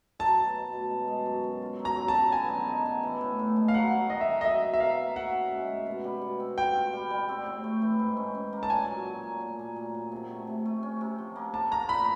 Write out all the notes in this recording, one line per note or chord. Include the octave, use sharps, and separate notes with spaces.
F#3 A5
B2
B2
B2
G#3
G#3
F#2
F#2
F4
F#3
A#5
F#3
A5
F#3
B3 G#5
D3
D#4
D3
E3
A2
A2
G#3
F5
F#3 F#5
F#3
D#3 D#5
E5
D#3
D#5
F#3 E5
B2
E5
F#3 F5
A#3
F#4 F#5
C#4
G#3
G#3
B2
G3
B2
C4
F4 G5
F4
G3
G3
C4
A2
A3
E3
G#2
C#4
C#4
A#3
A5
A#2 G#5
F#3
F#3
A#2
A#2
A#2
A#2
A#2
C3
A3
C3
A3
C#4
C3
F3
A#3
A#3 A5
A#3 A#5
A#2 B5